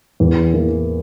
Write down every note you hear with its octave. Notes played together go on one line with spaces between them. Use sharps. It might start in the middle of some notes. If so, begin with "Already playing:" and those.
E2
E3 A#3